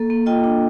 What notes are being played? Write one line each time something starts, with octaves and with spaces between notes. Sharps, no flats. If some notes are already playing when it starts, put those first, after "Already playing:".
Already playing: A#3 A4
A#3
F4 D#5 G5
D4